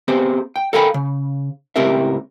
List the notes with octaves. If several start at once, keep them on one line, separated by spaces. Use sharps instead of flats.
B3 C4 G4 G#4 C5
G5
A4 A#4 F5 G5 G#5 B5
C#3
C#2 A2 C4 G4 A#4 E5